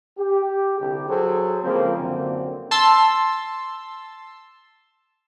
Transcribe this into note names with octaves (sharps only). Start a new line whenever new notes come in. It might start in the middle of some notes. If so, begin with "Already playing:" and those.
G4
C2 D3 G4
F#3 G#4 A4 C5
C#3 F3 G#3 A#3 C4
C2 F#2 D3 A#3 C4
A5 C6 E6